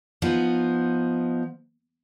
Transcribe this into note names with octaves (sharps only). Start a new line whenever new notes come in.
F3 B3 D#4